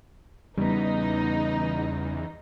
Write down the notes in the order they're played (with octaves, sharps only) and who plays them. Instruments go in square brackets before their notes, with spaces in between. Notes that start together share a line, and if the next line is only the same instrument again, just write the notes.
[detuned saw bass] E2 [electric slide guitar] C#3 B3 [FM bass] G3 [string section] D#4